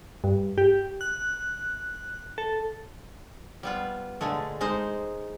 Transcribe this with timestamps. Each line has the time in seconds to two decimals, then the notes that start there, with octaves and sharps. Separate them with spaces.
0.24 G2
0.58 G4
1.01 F#6
2.38 A4
3.63 G3 B3 F4
4.21 A#2 D3 G#3 A3
4.61 G#3 D#4 C5